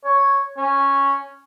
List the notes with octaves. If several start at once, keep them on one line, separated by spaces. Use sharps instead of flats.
C#5
C#4